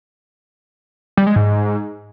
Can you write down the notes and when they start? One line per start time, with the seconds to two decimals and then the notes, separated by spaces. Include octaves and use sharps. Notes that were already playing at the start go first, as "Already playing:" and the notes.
1.17 G3
1.27 G#3
1.36 G#2